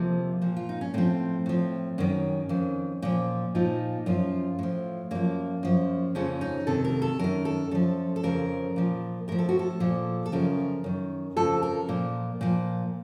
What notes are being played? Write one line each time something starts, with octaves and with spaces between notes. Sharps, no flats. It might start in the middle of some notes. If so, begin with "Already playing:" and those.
Already playing: F2 C3 F3 A#3
A#2 F3
F4
D#4
C#4
A2 F3 C4
A2 F3
F#2 D#3 C#4
F2 D#3
A#2 F3
A#2 F3 D#4
F#2 F3 F4
A2 F3
F#2 F3 A#3
F#2 F3
F2 C#3 F3 C#4
D#4
F2 C3 D#3 A4
A#4
A4
F#2 D#3 A#4
A4
F#2 F3 A4
A4
F2 C#3 F3 A#4
A#2 F3
A2 F3 A#4
A4
F#4
A4
A#2 F3
A4
F#2 C#3 F3 A#4
F#2 D#3
F2 C#3 F3 A4
A#4
A#2 F3
A#2 F3